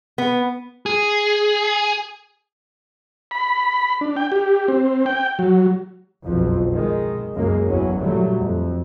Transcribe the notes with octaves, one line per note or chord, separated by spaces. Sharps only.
B3
G#4
B5
D4
G5
G4
C4
G5
F#3
F#1 B1 F2 F3
D#3 G#3
C#2 F#2 C#3 G#3 A#3
A1 E2 F#3 C#4
A#2 D3 F#3 G3 A3
F2